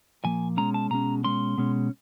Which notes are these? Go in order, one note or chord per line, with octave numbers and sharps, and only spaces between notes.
A#2 F3 A#3 G#5
B2 G#3 C#4 A#5
A5
B2 G#3 C#4 A#5
B2 G#3 C#4 C6
B2 G#3 C#4